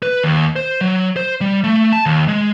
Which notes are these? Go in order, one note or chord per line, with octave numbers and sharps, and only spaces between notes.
B4
D#2
C5
F#3
C5
G3
A3
A5
D#2
G#3